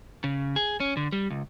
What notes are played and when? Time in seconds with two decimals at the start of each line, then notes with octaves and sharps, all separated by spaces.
0.24 C#3
0.56 G#4
0.80 C#4
0.97 D3
1.12 G3
1.30 C#2